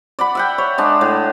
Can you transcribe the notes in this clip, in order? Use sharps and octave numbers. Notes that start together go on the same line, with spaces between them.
D5 F#5 B5
E5 F#5 G5
C#5
G#3 D4
A2